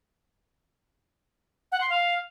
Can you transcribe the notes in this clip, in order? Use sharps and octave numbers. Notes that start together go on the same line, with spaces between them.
F#5
C6
F5